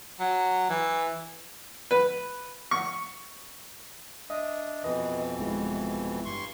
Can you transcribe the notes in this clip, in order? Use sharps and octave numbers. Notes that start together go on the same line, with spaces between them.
F#3
E3
B4
C#6
D4 D#5 E5 D#6
F2 B2 E3 B4 D#5
G1 G#3 E4
G2 C6 C#6